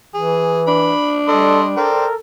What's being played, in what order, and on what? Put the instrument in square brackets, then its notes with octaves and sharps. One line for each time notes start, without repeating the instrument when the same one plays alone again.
[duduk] E3 [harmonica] G#4
[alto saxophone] D4 [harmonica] B5
[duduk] G3 [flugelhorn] A4 [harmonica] D#5 C6
[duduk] A4 [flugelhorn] A#4 [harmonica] C5 D5 G5